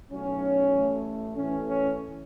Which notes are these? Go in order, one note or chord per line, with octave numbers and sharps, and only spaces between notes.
B1 A2 F#3 C#4
A1 A2 A3
A1 A2 E3 A3 C#4
C#4